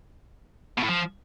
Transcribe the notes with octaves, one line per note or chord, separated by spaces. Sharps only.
B2
A2
F3